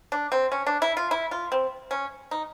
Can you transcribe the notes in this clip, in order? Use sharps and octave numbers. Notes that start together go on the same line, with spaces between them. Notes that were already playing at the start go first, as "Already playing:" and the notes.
D4
C4
C#4
D4
E4
F4
E4
F4
C4
C#4
D#4